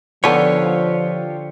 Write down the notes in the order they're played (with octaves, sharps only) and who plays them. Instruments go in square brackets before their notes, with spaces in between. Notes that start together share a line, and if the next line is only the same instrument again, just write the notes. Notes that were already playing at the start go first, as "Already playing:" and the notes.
[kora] D3 [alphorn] F3 [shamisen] B3 D4 D#4 [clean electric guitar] F4 G4 C#5